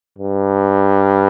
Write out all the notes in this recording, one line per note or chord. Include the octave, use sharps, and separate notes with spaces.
G2